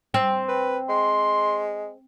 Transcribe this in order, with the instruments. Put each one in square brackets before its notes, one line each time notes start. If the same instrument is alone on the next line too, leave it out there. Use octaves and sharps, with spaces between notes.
[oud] C4
[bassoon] B4
[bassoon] G#3 [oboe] C6